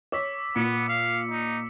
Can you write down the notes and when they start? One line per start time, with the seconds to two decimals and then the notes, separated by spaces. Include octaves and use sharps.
0.12 C#5 D6 E6 B6
0.56 A#2 B3 C#7
0.89 F5
1.31 D#4